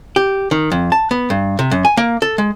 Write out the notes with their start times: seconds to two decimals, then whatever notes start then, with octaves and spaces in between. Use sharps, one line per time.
0.16 G4
0.51 D#3
0.72 F2
0.92 A5
1.11 B3
1.30 G2
1.59 C3
1.71 F#2
1.85 G#5
1.97 A#3
2.22 A4
2.38 G#3